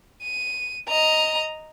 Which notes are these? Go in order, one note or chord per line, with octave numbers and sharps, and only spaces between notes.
D#7
D#5 A#5